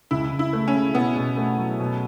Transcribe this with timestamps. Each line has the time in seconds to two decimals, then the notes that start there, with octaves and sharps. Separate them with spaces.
0.11 C#2 E4
0.32 C#2
0.39 E4
0.53 A3
0.68 C#4
0.74 C#3
0.95 B2 B3
1.16 B2
1.37 A3
1.58 F#3
1.79 B2